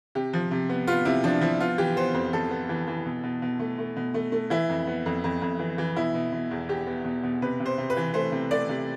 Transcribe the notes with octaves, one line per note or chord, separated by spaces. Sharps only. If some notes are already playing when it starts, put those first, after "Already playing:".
C3 G4
F3
C3
B3
B3 F4
C3 E4
F3 D4
F3 E4
B3 F4
E3 G4
B3 C5
F2 C5
F2 A4
B3
E3
E3
B2
B2
B2
A3
A3
B2
A3
A3
E3 E4
F2
B3
F2
F2
F2
E3
E3
B2 E4
B2
B2
E2
E2 G4
B3
B2
B2
C3 B4
C3
C5
C3
B4
E3
A3 C5
C3
A3 D5
C3